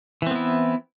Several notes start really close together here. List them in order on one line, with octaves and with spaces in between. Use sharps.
E3 C4 B3 E4